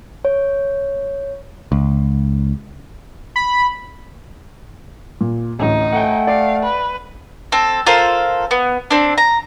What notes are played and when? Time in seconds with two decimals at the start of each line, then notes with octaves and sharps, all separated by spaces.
0.25 C#5
1.72 C#2
3.36 B5
5.21 A#2
5.59 A1 D2 A2 D#4
5.93 A3 F#5 G5
6.27 D5 F5
6.62 B4
7.52 C4 A4
7.87 F4 A4 A#4 C5
8.51 B3
8.91 C4 D4
9.18 A#5